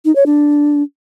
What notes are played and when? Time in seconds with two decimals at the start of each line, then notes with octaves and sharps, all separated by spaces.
0.05 D#4
0.16 C#5
0.26 D4